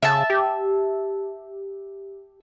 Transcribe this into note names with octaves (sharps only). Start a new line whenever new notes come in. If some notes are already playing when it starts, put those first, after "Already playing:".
C#3 E5 A5
G4